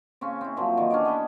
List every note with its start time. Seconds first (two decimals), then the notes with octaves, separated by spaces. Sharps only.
0.21 C#3 C4 C#4
0.41 C4 E4
0.57 A#2 F3 F#3 C4
0.77 D#3 E3
0.90 C#4 D4 D5
1.05 B3 D#5 E5 B5